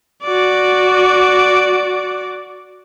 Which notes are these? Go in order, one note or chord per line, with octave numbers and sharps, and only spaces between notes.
F#4 D5